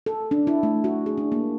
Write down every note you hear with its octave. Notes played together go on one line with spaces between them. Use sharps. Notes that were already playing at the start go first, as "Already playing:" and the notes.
A4
D4
E4
A3
F#4
G#4
D4
A#3